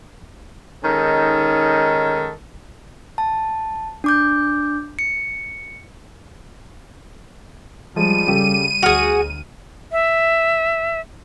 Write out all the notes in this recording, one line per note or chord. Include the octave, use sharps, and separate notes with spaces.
D#3 G#3 C#4 D#4 A4
A5
D4 D6 G6
C#7
F3 G3 G#3 D#7
C#3 G4 A4
D2 F#4 G#4 F6 F7
E5